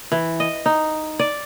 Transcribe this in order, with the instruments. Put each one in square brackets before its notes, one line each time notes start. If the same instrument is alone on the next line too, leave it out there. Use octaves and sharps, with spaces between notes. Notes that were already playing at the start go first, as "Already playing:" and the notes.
[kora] E3
D#5
D#4
D5